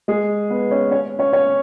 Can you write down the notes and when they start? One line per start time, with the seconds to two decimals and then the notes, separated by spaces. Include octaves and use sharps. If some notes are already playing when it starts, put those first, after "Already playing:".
0.08 G#3 G#4
0.50 B3 B4
0.71 C#4 C#5
0.91 C#4 C#5
1.19 C#4 C#5
1.33 C#4 C#5